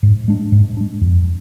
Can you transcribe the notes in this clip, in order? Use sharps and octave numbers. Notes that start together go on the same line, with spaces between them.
G#2
G#3 D4
G#2
G#3 D4
F2